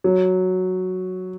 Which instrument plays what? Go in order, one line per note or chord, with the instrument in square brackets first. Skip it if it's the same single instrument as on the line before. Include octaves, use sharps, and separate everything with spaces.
[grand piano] F#3